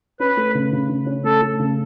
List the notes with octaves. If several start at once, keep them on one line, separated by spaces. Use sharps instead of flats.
C#4 B4
A3
C#3
C#3
C#3
C#4
A3 A4
A3
C#3